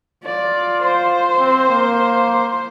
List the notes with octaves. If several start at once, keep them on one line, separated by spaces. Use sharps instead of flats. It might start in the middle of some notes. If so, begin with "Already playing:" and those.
F4 D5
C5
C4
A#3